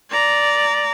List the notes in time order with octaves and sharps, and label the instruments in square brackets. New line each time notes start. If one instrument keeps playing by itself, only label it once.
[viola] D5 A#5